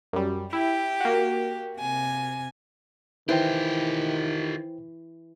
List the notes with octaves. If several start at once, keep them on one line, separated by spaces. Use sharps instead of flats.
F#2 G3
E4 G4
A#3 F#4
C3 G#5
D#3 E3 E4 F4 G4 C5 G5